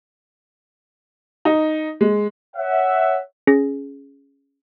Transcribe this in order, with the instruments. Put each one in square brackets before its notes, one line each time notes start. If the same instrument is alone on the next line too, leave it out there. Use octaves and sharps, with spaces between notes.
[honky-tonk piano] D#4
G#3
[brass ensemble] C#5 E5 F#5
[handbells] C#4 G#4 A#6